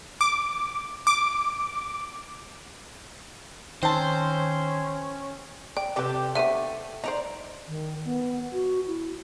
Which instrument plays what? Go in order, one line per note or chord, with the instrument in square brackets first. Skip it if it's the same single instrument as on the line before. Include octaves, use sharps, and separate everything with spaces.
[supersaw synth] D6
D6
[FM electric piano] D#3 [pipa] C4 A5 [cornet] C#4 [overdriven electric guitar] C5
[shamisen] D5 [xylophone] G5
[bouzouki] C3 G4 A4 [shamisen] B4 D5
[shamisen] D3 B3 C5 [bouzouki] A3 [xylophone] E5 D#7
[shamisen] D#4 C5 [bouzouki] D5 A#5
[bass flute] D#3
B3
F#4
E4